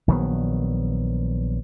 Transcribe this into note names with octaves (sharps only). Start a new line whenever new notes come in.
A#1 D#3 F#3 B3